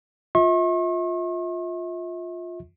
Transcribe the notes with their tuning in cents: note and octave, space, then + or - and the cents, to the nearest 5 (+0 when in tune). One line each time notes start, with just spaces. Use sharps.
F4 +10 E5 -40 C#6 -45